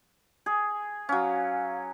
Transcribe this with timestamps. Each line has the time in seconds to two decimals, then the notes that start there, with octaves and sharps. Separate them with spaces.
0.46 G#4
1.09 F#3 C#4 F5